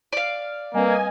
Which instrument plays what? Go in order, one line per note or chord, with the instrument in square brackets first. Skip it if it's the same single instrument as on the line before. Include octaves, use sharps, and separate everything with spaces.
[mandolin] D5 F5
[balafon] G3 C4 B4 [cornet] A#3 [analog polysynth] D#5 G#5